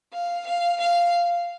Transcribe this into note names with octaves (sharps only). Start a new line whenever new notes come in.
F5
F5
F5